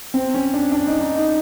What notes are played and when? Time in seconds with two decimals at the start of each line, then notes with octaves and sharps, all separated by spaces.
0.14 C4
0.34 C#4
0.54 D4
0.72 D4
0.87 D#4
1.01 D#4
1.16 D#4